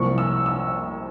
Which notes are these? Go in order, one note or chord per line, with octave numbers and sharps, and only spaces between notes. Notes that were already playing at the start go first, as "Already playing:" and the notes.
Already playing: C2 C3 F3 A#3 C#6
E6
E6